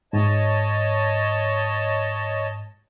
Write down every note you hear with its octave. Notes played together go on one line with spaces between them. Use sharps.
G#2 C#5 D#5 A5